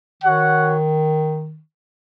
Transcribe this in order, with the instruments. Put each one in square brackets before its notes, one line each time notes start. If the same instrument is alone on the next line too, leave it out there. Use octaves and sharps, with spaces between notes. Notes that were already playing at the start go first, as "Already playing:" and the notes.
[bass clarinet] D#3 [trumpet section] F#4 C#5 F#5